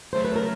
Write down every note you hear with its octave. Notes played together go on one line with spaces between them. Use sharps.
C#3 F#3 A3 C5
B4
A#4